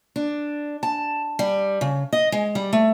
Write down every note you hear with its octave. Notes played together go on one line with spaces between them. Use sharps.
D4
A5
G3
C#3
D#5
G#3
G3
A3